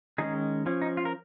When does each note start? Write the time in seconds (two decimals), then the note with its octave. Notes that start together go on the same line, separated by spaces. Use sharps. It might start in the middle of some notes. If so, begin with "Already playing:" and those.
0.18 D#3 G#3 C#4 D#4 G#4
0.66 F3 C#4
0.82 D#4
0.97 F4
1.05 A#4